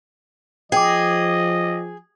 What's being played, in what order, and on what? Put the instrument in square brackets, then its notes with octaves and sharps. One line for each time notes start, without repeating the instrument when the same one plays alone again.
[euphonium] F3 [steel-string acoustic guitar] G#4 [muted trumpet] D#5 [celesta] G5 D6